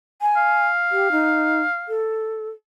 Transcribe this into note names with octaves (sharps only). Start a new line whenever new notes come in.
G#5
F5
G4
D#4
A4